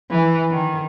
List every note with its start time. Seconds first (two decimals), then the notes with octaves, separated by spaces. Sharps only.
0.10 E3
0.52 D#3